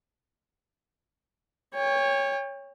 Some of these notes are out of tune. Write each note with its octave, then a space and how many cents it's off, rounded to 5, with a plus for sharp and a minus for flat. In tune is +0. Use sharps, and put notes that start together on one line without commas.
C#5 +0 G5 +40